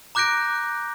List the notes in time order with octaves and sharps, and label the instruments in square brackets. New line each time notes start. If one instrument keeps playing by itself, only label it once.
[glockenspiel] A#5 D6 F#6 G6 A#6 D7